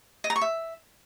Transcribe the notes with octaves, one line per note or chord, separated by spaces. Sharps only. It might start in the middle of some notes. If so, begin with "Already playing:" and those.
D#5
A#5
C#6
E5